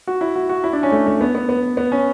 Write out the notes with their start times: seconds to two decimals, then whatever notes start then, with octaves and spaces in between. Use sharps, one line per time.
0.07 F#4
0.21 E4
0.36 F#4
0.49 F#4
0.64 E4
0.73 D4
0.83 C#4
0.92 A3
1.07 A3
1.21 B3
1.35 B3
1.49 B3
1.77 B3
1.92 C#4